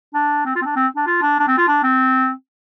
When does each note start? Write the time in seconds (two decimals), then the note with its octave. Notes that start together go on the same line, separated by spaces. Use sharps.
0.14 D4
0.45 C4
0.56 F4
0.62 C4
0.65 D4
0.76 C4
0.96 D4
1.07 F4
1.22 D4
1.39 D4
1.47 C4
1.58 F4
1.68 D4
1.83 C4